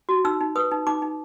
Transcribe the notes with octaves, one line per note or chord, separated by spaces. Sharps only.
F#4
D#4 E6
D#4
B4 D#6
D#4
D#4 D6
D#4